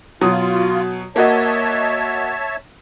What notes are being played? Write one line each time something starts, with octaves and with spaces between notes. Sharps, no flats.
B2 F#3 F4 D#6
A#3 F#4 C#5 D#5 E5 A5